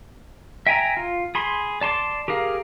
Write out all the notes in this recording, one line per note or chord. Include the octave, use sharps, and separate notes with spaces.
E5 G5 G#5 A#5
F4
G#4 B5 C6
D5 A5 C6 D6
G4 G#4 A#4 F5